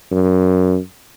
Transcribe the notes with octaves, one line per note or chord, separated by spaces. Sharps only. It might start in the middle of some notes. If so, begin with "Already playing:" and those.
F#2